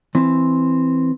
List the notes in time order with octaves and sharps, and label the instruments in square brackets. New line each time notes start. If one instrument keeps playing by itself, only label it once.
[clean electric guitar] E3 C4